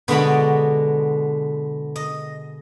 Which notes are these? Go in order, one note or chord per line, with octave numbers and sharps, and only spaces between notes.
B2 D3 G#3 B3 D5 B5
D#5